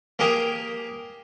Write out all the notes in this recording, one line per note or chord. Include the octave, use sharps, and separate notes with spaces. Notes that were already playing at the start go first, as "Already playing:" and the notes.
A#3 G4 G#4 A#4